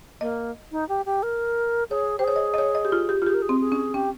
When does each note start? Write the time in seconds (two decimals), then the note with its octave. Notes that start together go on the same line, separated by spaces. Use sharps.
0.21 A#3 D#5
0.72 D#4
0.89 G4
1.06 G4
1.23 A#4
1.90 G#4 C#5
2.19 G4 C5
2.24 G#4 C#5
2.36 D#5
2.54 D#5
2.58 C#5
2.75 D#5
2.85 G4
2.92 F4
3.09 G4
3.22 F4
3.26 G4 G#4
3.34 A#4
3.42 G#4
3.49 C4
3.60 G#4
3.72 C#4
3.94 C#4 G4